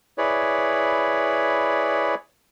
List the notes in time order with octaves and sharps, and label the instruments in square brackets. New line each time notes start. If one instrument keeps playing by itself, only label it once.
[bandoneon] E4 G#4 B4 C#5 D5